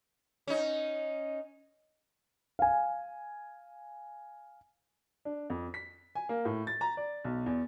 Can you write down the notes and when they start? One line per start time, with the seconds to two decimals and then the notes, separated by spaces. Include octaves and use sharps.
0.47 C#4 D#4
2.59 F5 G#5
5.25 D4
5.50 F2
5.74 B6
6.15 G#5
6.29 A#3
6.45 A2
6.67 A6
6.81 A#5
6.97 D5
7.24 B1
7.46 E2